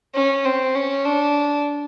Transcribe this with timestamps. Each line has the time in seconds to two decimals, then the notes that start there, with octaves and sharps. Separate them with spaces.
0.15 C#4
0.45 C4
0.75 C#4
1.05 D4